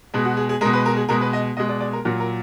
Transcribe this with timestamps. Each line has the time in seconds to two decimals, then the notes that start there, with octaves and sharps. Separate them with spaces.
0.14 B2 G#3 G#4
0.25 F#4
0.37 G#4
0.49 G#4
0.61 G#3 A#4
0.65 B2
0.73 B4
0.86 A#4
0.97 G#4
1.09 B2 G#3 A#4
1.21 B4
1.33 D#5
1.57 B2 G#3 D#5
1.69 D5
1.80 D5
1.93 A#4
2.05 A#2 F#3 A#4
2.20 A#4